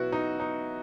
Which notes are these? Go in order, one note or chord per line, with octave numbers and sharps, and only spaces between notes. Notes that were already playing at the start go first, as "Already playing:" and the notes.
Already playing: E2 B2 F#3 B3 E4 F#4
D#4
D#4